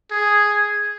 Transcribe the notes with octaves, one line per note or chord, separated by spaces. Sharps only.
G#4